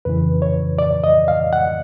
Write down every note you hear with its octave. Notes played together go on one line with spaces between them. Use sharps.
F2 C#3 E3 B4
C#5
D5
D#5
F5
F#5